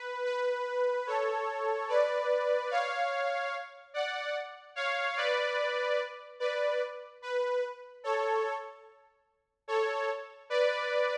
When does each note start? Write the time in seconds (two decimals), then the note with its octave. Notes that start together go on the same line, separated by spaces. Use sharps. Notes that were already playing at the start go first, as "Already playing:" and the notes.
Already playing: B4
0.25 B4
1.07 A4 C#5
1.89 B4 D5
2.71 C#5 F5
3.94 D5 F#5
4.75 C#5 F5
5.17 B4 D5
6.40 B4 D5
7.22 B4
8.04 A4 C#5
9.68 A4 C#5
10.50 B4 D5